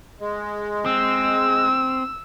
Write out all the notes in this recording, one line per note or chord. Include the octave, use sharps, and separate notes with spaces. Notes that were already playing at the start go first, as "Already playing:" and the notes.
G#3
C4 E6